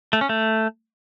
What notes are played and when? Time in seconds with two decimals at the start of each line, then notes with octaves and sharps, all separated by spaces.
0.13 A3
0.21 C#4
0.29 A3